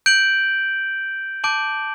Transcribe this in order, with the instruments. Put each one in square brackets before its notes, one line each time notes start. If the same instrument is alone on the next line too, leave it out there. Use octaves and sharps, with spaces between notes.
[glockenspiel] G6 D7 F#7
A5 D6 G6 D7 F#7